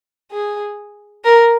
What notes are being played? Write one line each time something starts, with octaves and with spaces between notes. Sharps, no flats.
G#4
A#4